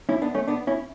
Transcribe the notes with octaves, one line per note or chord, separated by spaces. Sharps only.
C#4 E4
B3 D4
A3 C#4
B3 D4
C#4 E4